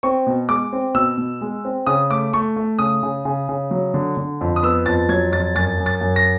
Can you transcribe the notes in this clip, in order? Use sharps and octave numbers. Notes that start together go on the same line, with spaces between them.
C4 C#6
B2
G#3 D6
C4
B2 E6
B2
G#3
C4
C#3 D#6
A3 D6
A3 C#6
A3
C#3 D#6
C#3
C#3
C#3
F#3
D3
D3
F2
D#6
B3 E6
F2 A6
F#3 G#6
F2 A6
F#2 A6
F#2
A6
F#2
A#6